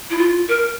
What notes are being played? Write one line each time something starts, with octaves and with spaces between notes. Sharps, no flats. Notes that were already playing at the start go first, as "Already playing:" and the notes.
E4
F4
A#4